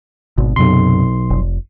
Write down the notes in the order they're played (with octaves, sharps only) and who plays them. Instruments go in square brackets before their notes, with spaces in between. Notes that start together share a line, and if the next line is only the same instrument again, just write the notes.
[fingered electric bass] G#1 B2
[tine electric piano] B1 C6 [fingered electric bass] F#2 C3
[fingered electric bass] F1